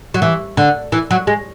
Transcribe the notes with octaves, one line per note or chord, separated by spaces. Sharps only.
F#3
E3
D3
E3
F#3
G#3